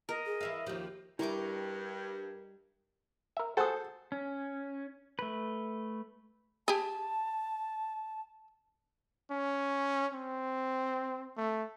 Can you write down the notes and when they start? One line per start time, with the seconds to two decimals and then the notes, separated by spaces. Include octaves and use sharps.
0.09 A#4 D#5
0.26 G#4
0.41 E3 E5 F5
0.66 D#2 F3 G4
1.19 G2 G3 E4 A#4 D#5 C#6 D6
3.37 A#4 E5
3.57 F#4 G#4 A4 C5 F#5
4.12 C#4
5.19 A3 B4
6.68 G4 G#4 A5
9.31 C#4
10.14 C4
11.37 A3